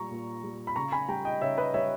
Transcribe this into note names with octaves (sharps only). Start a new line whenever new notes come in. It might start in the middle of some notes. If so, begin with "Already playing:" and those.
Already playing: A#2 G3 A#5 C#6
A#2
G3
B5
C#3 A#5 C#6
G#5 B5
G3 G5 A#5
D#5 G5
C#3 C#5 E5
B4 D#5
G3 C#5 E5